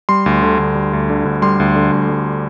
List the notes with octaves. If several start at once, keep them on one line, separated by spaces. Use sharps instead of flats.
G3 C6
D2
D3
D2
G3
D2
D3
D2
G3 C6
D2
D3
D2
G3